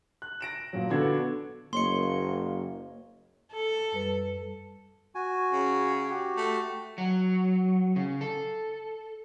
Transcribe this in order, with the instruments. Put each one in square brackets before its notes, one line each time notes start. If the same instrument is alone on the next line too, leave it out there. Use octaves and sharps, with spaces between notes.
[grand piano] F#6
A#6 D7 E7
A#2 F3 F#3
D3 B3 D4 F#4 A4 G#6
[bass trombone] F#1 [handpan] A#3 C#5 D#5 [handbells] C6 C#7
[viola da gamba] A4
[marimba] F#2 G3 B4
[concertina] F#4 G#5
[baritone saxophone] C#3
[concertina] F#4 G4
[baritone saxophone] A3
[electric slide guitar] F#3
C#3
A4